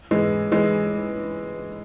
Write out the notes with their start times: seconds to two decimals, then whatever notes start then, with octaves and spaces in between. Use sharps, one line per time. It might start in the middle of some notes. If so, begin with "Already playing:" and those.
0.11 E3 G#3
0.52 E3 G#3